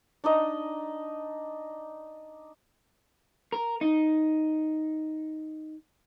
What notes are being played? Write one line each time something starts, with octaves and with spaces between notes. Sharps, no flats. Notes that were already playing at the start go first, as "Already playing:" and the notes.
D4 D#4 D#5
A#4
D#4